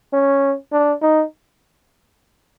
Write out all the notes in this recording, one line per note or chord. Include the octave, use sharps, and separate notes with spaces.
C#4
D4
D#4